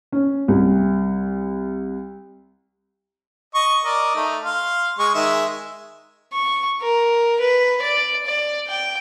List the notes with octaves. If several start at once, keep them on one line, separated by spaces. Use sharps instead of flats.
C#4
C2
D#5 C#6
A#4 D5 D#5
A3 D#4
F5 C6
G#3 C#6
D#3 G#3 E5
C#6
A#4
B4
D5
D5
G5